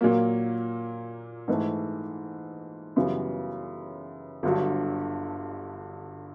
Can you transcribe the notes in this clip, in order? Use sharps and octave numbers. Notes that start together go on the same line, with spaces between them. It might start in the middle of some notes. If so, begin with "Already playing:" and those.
A#2 F#3 A#3
G#2 E3 A3
F#2 C#3 E3 G3 B3
G1 G2 D3 F#3